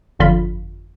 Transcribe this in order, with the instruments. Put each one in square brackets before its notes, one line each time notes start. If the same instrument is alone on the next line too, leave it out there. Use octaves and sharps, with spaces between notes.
[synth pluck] G1 F2 D3 F4 B5